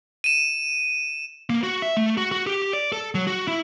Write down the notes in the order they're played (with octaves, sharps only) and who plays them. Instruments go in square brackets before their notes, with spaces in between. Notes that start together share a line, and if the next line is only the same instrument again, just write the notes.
[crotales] D#7 E7
[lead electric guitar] A#3
F#4
E5
A3
F#4
F#4
G4
D5
A4
F#3
F#4
E4